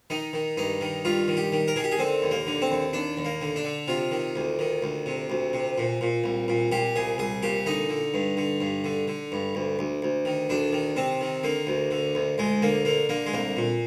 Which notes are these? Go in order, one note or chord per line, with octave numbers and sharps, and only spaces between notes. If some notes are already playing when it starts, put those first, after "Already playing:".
D#3 D#4
D#3
G2 D#4
D#3
G2 F4
D#3
G4
D#3
A#4
D#3 G#4
G4
G#4
D3 C4
D#2
A#3
D3
C4
D#2
D#2 D4
D#2
A#3
D3
D4
D3
C3 F4
D#3
D2
D#3
D2
C3
D2
C3
A#2
A#2
C2
A#2
A#2 G4
C2 G#4
C2 G#4
A#2 G4
D3 D#4
D3
G2
D3
G2
D3
D3
G2
D2
D2
D2
D#3
D2 D4
D#3
C3 C4
D#3
D3 A#3
D2
D3
D2
D2 G#3
D3 A#3
D3 A#3
D3 A#3
G#3
C2 A#3
A#2